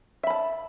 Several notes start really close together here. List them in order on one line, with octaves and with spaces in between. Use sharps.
E5 B5 A5